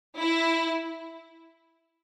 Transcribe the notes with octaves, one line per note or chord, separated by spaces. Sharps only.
E4